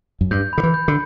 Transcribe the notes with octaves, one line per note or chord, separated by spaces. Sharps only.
F#2
G2 G6
D3 B5
E3
G6
D3